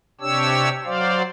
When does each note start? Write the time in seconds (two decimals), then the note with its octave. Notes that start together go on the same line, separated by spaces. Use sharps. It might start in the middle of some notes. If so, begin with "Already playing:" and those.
0.21 C3 D4 G4 C#5 E6
0.84 F#3 C5 D5 F5